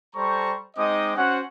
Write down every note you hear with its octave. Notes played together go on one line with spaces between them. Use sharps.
G3 A4 C5 A#5 C#6
G#3 C4 D#4 D#5 D6 D#6
C#4 F#4 C5 F#5